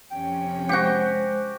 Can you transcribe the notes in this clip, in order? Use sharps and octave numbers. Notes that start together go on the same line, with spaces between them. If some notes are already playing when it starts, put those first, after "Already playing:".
F2 C3 C#4 G5
G#3 F#4 G4 C5